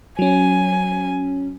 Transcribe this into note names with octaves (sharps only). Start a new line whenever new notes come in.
F#3 C#4 G#5